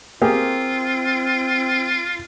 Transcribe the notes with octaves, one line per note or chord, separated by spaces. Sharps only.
A#3 C4 F4 G4 G#4